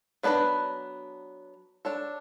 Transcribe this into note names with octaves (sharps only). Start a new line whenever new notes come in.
F#3 B3 D4 F#4 B4
D4 A4 C#5